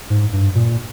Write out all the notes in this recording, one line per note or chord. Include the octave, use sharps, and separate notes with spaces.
G#2
G2
A#2